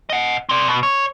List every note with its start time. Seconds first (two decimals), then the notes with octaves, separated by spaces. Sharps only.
0.10 D#5 F#5
0.49 C4 D5
0.68 B2
0.83 C#5